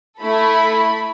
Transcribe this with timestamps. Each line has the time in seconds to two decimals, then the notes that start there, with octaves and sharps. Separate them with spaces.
0.20 A3 E4 A4 B5